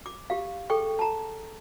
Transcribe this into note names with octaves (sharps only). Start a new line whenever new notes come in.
D6
G4 F5
G#4 A4 G5 C#6
A5 A#5